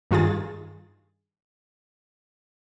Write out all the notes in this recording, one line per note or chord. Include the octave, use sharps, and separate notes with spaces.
G2 D#3 F4 G#4 A6